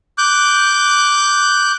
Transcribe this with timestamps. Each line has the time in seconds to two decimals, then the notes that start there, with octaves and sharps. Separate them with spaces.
0.18 D6 F#6 G6